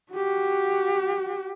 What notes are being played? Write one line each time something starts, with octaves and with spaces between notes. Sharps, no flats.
F#4 G4